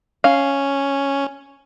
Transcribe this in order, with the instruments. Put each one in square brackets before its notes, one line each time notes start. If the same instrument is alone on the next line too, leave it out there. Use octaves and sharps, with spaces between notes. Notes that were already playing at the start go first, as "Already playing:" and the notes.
[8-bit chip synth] C#4 [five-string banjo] F5